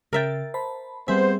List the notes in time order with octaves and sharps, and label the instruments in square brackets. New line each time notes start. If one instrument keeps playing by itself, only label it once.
[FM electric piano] C#3 A6 [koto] A#4 E5 G5
[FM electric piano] C5 A5 B5
[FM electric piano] G3 C4 G#4 [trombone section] B3 C5 [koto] E5